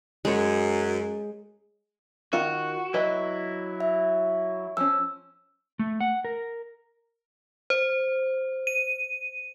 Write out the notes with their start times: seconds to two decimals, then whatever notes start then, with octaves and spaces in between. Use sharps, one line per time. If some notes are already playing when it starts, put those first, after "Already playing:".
0.25 F#2 G#3 C#5
2.33 D#3 F4 F#4
2.94 F#3 E4 B4 D#5
3.80 E5
4.77 F3 C#4 E6
5.79 A3
6.00 F#5
6.25 A#4
7.70 C5
8.67 D#7